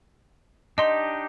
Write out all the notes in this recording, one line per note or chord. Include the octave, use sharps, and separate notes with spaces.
D4 D#4 G4 D#5 C6